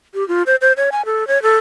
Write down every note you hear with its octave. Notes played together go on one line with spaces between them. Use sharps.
G4
F4
C5
C5
C#5
G#5
A4
C#5
A4